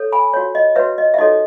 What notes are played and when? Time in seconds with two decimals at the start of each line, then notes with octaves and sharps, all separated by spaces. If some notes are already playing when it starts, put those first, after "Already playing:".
Already playing: A4 C#5
0.12 G#5 B5
0.34 F#4 C#5
0.55 D#5
0.76 F#4 B4 C#5 E5
0.98 D#5
1.14 E5
1.18 D#4 F#4 A4 C#5 D#5